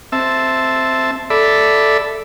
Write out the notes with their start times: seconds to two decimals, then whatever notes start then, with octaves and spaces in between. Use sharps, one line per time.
0.12 C4 E5 A5
1.30 A4 D5 E5 B5